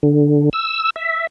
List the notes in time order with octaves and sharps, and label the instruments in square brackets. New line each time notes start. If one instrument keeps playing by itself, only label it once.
[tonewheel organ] D3
E6
E5